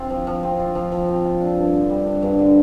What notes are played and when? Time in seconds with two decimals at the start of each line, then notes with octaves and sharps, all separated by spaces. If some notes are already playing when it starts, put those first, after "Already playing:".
Already playing: C4 F4
0.10 F3
0.27 F3
0.43 C4
0.59 F4
0.75 F3
0.92 F3
1.09 C4
1.25 F4
1.41 D4
1.58 G2
1.74 D3
1.90 G3
2.06 D4
2.22 G2
2.39 D3